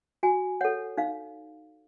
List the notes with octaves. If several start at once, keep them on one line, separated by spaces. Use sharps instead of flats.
F#4 G#5
A4 C#5 F#5
D#4 F5